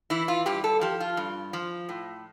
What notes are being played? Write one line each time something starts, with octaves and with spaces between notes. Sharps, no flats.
E3 E4
F4
G2 G4
A4
F3 G4
F4
G2
F3
A2